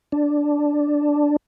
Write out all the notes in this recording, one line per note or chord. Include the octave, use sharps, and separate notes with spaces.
D4